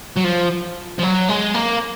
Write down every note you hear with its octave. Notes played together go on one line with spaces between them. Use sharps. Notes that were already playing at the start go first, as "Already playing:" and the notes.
F#3
F3
F3
F#3
G#3
A#3